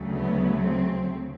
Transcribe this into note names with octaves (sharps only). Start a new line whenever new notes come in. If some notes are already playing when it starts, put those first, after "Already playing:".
Already playing: D2 C#3 F#3 A3
B3
C4